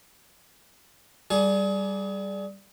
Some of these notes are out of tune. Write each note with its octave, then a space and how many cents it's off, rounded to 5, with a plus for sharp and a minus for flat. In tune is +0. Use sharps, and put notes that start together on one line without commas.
G3 +0 G#4 +30